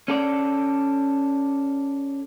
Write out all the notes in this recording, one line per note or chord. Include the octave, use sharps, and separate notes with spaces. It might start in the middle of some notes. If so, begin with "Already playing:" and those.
C#4 A4 D5